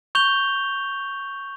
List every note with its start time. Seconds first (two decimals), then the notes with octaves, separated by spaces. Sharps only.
0.15 C#6 G6 F7 G7